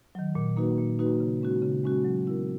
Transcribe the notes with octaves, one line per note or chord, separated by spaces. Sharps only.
D#3 F#3
A#2
A#3 D#4 F#4 B4
A#2
A#3 D#4 F#4 B4
C#3
G#3 C#4 F#4
C#3
G#3 C#4 F#4
F#3
B3 E4 A#4